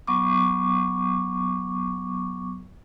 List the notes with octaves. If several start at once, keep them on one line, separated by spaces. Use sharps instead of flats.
F#3 B3 C#6 D6